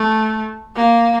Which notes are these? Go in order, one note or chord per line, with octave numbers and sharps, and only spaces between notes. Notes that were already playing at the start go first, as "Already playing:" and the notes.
Already playing: A3
A#3